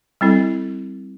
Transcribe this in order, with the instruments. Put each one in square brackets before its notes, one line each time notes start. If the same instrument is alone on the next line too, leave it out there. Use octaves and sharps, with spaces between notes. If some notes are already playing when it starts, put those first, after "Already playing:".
[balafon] G3 C4 E4 A4